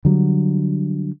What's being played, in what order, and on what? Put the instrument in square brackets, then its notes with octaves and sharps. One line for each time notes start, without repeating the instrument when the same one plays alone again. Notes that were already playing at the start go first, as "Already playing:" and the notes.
[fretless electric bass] D3 F#3 G3